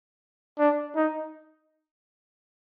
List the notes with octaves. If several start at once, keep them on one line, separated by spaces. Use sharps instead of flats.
D4
D#4